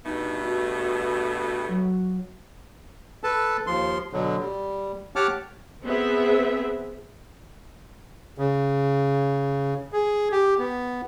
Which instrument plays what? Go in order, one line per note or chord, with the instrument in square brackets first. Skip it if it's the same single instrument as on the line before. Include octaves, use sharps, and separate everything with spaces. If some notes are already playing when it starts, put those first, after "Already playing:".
[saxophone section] G2 B2 A3 [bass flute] D#4
[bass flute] F#4
F#3
[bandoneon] A4 B4 A5
D#2 F3 C6
B2 D3 F#3
G3
G4 C#5 F#5 A5 D6 F6
[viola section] B3 C4 G#4 E5
[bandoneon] C#3
G#4
G4
B3